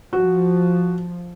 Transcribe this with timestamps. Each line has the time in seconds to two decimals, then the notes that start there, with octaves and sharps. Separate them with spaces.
0.13 F3 F#4